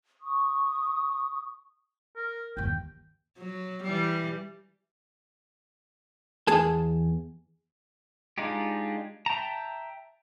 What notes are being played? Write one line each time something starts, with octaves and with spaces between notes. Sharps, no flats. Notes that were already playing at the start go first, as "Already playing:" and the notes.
C#6 D#6
A#4
G1 D#2 G5
F#3
E3 G3
E2 G#4 A5
G#3 D4 D#4 F4 G4
E5 G5 A5 A#5